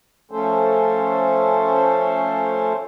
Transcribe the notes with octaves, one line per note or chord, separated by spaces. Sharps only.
F3 A3 C#4 A4 C5